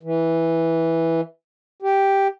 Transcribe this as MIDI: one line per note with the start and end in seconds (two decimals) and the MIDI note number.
0.03 1.21 52
1.82 2.28 67